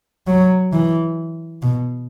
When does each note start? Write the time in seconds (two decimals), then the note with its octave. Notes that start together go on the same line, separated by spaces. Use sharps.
0.27 F#3
0.73 E3
1.62 B2